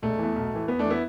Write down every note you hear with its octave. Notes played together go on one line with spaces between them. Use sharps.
E1 A3
E2 E3
B1
A2 E3
E2 B3
A3 D4
E3
B3 E4